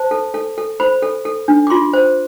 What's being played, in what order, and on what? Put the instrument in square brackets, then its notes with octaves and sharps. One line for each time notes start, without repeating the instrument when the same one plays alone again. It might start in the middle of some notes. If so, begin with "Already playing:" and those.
Already playing: [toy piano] C5 A5
A4
A4
A4
C5 B5
A4
A4
D4
D6
F4 C6
C5